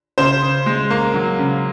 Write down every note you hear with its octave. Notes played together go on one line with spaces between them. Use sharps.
C#3 C5
C#3
G#3
A#3
F#3
C#3